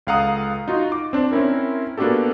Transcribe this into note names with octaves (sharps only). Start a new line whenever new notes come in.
C#2 A4 F5 F#5 A#5 D#6
D#4 F4 F#4
D6
C4 D4
C4 C#4 E4 A#4
A#3 B3 D4 F#4 G4 A4